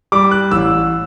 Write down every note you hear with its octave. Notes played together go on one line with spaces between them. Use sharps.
G3 D6
F#6
A1 E6